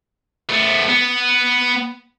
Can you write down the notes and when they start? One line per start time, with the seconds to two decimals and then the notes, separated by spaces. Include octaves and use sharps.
0.50 A3 B3
0.89 B3